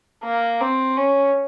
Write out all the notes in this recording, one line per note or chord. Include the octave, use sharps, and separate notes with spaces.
A#3
C4
C#4